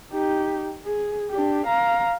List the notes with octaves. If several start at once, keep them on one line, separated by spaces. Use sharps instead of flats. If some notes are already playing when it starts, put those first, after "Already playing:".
D#4 G4
G#4
D4 G4
F5 A#5